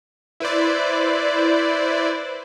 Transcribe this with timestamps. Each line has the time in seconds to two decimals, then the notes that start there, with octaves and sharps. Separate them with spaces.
0.40 E4 B4 C5 D5